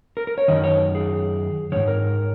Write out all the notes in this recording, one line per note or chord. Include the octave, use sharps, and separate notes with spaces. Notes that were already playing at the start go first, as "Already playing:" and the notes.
A#4
A#4
C#5
F#2 D#3 D#5
C#5
G#4
G#2 D#3 C#5
A#4